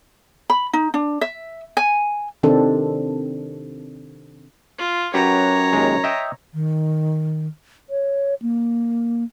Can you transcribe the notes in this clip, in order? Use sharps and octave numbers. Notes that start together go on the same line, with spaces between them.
B5
D#4
D4
E5
G#5
C3 D#3 C4 D4 A4
F4
F#2 F#4 G4 B4 C#5 A#5
D#2 G#3
D#5 E5 G5
D#3
C#5
A#3